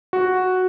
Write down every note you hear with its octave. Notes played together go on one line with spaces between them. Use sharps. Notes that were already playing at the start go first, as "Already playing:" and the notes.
F#4